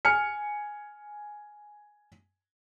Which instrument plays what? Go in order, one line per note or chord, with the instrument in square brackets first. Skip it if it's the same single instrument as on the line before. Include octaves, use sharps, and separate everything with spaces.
[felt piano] G#5 F6 C#7